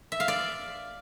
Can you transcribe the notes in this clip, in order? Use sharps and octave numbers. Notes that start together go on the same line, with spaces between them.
E5
F5
D5